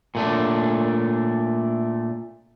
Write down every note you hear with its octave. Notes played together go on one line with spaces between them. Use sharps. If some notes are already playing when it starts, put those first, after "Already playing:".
A#2 A3 D4